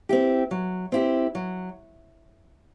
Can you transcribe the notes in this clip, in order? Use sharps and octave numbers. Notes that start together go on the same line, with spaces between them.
C4 E4 G4
F#3
C4 E4 G4
F#3